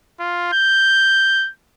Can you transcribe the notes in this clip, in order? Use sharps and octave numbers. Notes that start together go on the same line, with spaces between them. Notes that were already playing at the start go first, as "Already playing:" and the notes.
F4
G6